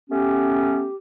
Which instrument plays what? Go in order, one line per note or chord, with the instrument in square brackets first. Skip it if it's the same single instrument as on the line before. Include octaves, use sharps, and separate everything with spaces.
[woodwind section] A3 B3 C#4 [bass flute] G4